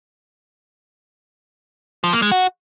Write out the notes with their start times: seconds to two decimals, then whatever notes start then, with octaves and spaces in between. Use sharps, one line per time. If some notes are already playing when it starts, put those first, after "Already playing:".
2.04 F3
2.13 A#3
2.22 G#3
2.31 F#4